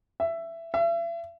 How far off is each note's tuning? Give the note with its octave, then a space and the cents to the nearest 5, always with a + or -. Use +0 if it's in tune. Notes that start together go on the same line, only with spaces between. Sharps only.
E5 +15
E5 +40